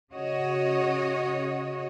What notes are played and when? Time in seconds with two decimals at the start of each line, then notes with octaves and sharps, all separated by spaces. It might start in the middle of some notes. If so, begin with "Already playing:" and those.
0.12 C#3 F#4 C#5 D#5